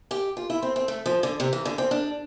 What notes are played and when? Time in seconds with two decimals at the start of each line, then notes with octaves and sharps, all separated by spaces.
0.11 G4
0.37 F4
0.50 E4
0.62 C4
0.76 C4
0.88 A3
1.06 F3
1.23 D3
1.40 C3
1.53 E3
1.65 D3
1.78 C4
1.91 D4